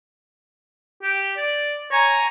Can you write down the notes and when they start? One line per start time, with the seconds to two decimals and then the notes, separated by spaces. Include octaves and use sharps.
1.03 G4
1.37 D5
1.91 C#5 G#5 A#5